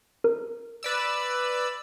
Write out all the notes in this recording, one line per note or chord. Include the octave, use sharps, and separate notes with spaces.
A#4
B4 D5 E6